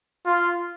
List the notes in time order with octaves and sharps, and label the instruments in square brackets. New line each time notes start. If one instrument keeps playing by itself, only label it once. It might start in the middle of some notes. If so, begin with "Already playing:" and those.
[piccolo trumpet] F4